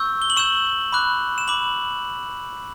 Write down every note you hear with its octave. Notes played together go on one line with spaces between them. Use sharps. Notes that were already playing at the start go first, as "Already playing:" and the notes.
Already playing: C#6 E6 G6
G7
F#7
C#6 E6 G6 E7
B5 D6 F#6
E7
B5 D6 F#7